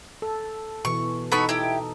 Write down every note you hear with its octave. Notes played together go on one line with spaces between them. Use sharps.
A4
B2 E3 C#6
B3 D#4 A4 B5 C#6
E4 G4